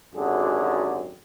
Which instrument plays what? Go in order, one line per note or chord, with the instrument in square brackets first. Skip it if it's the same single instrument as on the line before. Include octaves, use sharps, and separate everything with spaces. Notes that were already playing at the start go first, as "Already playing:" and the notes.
[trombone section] G#1 F#2 D3 G4 G#4